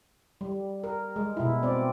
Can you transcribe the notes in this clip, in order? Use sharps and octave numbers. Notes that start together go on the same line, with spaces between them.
G3
A#4
G#3
B2 E4
C4 D5